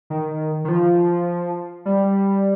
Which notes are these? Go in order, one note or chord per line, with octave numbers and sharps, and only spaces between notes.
D#3
D#3
F3
G3